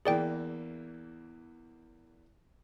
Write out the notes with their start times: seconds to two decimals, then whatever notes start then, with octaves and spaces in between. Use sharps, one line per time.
0.05 E2 E3 A#3 G#4 D5 G5